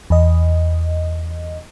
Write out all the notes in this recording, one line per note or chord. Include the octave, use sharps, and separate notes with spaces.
E2 D#5